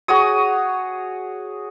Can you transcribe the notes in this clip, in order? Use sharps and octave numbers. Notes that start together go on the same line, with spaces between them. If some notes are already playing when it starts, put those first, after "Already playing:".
F#4 G#4 C#5 D#6